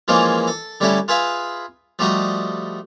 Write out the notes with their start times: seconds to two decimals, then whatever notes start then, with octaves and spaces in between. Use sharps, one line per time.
0.08 E3 F3 G#3 A#3 C#4 F4
0.47 A4
0.80 D3 G3 A3 C#4 E4 A4
1.08 F4 G#4 B4 E5 F5
1.99 F3 G3 A3 F#4 D#5